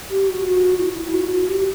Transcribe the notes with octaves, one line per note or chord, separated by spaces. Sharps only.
G4
F#4
F#4
F#4
E4
E4
F#4
F#4
G4